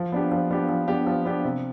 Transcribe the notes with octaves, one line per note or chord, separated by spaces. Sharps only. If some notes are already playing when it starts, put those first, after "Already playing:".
Already playing: F3
B3 D4 G4
F3
B3 D4 G4
F3
B3 D4 G4
F3
B3 D4 G4
C3